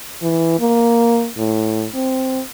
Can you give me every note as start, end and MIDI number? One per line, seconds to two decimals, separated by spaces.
0.22 0.58 52
0.60 1.28 58
1.37 1.86 45
1.94 2.42 60